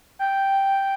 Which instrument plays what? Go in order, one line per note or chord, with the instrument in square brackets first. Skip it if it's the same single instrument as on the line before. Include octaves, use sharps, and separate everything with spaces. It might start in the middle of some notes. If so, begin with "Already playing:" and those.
[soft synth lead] G5